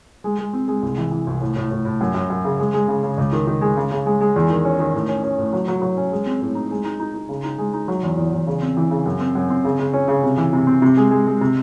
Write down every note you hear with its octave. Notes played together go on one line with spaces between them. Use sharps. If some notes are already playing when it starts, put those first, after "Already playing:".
G#3
G#3
C4
G#3
C2
E3
E3
C2
A2
A2
A2
A2
F#2
F#2
F#2
C#3
G#3
G#3
C#3
C#3
C#2
D#3
D#3
G#3
C#3
C#3
G#3
G#3
E2
D#3
C#4
D#3
A2
C#4
C#4
A2
F#3
F#3
F#3
C#4
G#3
C4
A2
D#4
G#3
D#4
D#4
D#4
C#3
D#4
G#3
D#4
F#3
E2
E2
E2
C#3
C4
E3
C#3
F#2
C4
F#2
C4
C#3
C#3
C#4
C#3
C3
E3
C3
C4
C3
G#3
G#3
G#3
C3